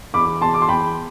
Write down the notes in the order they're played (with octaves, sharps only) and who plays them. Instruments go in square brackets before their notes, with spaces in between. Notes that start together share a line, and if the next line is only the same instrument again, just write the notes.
[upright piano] E2 B5 D6
E2 A5 C6
D6
C6
E2 G5 B5